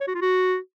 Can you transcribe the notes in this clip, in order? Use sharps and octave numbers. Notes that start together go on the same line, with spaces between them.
C#5
F#4
F4
F#4